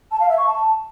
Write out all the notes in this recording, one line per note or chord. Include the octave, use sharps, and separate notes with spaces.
A5
F5
E5
C#6
A5